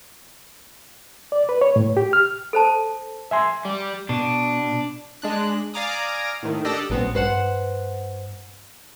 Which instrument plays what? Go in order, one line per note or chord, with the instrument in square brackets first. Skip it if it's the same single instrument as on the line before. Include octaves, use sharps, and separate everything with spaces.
[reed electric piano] D5
B4
C#5
A2
G4
F6
[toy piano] A4 C5 A5
[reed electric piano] E5 G#5 C6
[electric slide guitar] G3
[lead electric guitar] B2 [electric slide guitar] D4
[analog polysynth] G#3 D4 F#6
D5 F5 G#5 A#5 D6 D#6
A2 D#3
D4 G4 A4 D5 D#5
[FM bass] A#1 [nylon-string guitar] F#2 B3 C4
[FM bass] G2 [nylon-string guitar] B4 C5 F#5